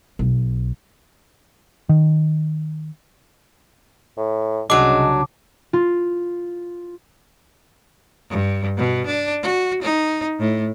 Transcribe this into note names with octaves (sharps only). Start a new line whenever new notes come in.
B1
D#3
A2
C2 C#3 F#3 G#3 D4 D6
F4
G2
B2
D4
F#4
D#4
A2